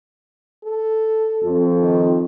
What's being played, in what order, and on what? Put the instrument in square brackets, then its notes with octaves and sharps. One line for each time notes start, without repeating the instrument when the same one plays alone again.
[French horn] A4
[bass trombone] F2
[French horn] D#3